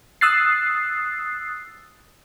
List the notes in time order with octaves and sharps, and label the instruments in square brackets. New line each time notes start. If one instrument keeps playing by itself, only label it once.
[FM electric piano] D#6 E6 F#6 A6 C7